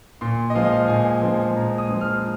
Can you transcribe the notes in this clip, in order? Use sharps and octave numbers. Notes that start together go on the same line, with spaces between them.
A#2 C6
D#5
F3 G#3 F5
D#5
F5
A#2 G#5
F3 G#3
A#2 A#5
D#6
F3 G#3
F6